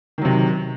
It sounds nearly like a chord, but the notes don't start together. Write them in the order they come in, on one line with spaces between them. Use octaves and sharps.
D#3 F#3 C3